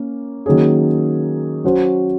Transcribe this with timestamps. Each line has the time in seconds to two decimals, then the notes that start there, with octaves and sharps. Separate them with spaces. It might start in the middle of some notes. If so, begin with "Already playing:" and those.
Already playing: A#3 C#4
0.46 D#3 F#3 A#3 C#4 G#4
1.64 F#3 C#4 F#4 C5